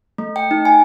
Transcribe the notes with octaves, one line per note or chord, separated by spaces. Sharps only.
A3
G5
D#4
G#5